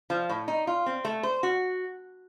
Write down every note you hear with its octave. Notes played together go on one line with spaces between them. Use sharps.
F3
A2
D#4
F4
C4
A3
C5
F#4